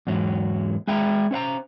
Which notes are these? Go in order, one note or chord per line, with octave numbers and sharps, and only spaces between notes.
E2 G#2 F#3
G#3 E5 G5 A#5
C#4 C5 F5 A#5